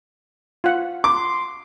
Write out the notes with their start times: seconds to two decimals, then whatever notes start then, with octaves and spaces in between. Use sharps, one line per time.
0.64 F4 F#5
1.04 C6 D6